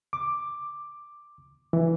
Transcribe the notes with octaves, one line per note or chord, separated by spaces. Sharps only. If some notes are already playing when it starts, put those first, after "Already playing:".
D6
E3